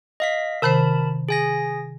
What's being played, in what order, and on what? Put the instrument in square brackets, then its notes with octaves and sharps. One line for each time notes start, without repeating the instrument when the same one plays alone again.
[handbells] D#5 F5 B6
[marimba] C3 D#3 C5 [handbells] A#4 A5 B5
[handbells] G#4 G#5 A#6